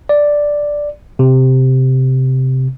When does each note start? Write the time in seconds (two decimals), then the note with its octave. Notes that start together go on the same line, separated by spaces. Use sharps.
0.09 D5
1.19 C3